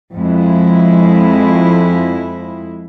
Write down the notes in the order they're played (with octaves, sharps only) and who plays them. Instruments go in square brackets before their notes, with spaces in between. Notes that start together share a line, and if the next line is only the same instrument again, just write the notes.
[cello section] F2 G#3 E4